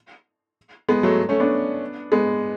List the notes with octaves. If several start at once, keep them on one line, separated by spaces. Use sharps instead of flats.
G#3 B3
F#3 A3
A3 C#4
B3 D4
G#3 B3